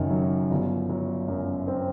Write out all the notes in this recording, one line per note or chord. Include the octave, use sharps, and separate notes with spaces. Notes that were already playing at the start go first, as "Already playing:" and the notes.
Already playing: F#1 F#2 D#3
F#3
G1
F#3
F#2
C4